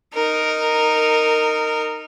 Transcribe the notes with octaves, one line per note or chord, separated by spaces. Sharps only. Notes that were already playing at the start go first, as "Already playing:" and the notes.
D#4 A#4